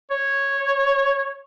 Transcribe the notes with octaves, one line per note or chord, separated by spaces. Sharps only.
C#5